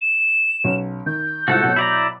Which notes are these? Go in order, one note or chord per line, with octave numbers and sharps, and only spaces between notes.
E7
B1 F#3 C#4
D#3 G6
C2 G#2 F4 F#4 A4 F#5
B2 F#3
E4 D5 A#5